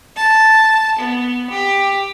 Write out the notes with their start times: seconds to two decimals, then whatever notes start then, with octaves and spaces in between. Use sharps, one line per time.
0.16 A5
0.99 B3
1.50 G4